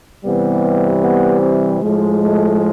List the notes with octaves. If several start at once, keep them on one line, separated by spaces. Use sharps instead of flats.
C3 E3 G3 B3
B3
C4
A2 F3 G#3
A3